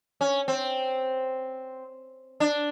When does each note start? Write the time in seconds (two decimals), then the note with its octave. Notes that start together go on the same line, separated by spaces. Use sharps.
0.21 C#4
0.48 C4
2.40 D4